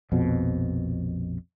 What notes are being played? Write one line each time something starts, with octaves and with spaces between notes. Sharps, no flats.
A#1 F2 B2